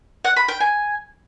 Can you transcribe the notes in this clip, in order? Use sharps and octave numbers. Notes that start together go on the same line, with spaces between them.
F#5
B5
G5
G#5